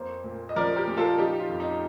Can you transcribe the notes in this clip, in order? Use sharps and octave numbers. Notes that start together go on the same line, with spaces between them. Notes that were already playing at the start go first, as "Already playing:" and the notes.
Already playing: F2 A#3 C5
A#2
D#5
F3 A#4 D5
G4 A#4
A#2
F4 A4
F3 D#4 G4
F4
F2
D#4
D#4